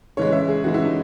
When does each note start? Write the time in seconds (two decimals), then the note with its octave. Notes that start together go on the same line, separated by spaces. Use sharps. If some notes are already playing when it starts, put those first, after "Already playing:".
0.17 C#3 E3 G#3 C#5
0.32 E5
0.48 G#4
0.64 C#3 E3 G#3 F#4
0.74 E4
0.85 D#4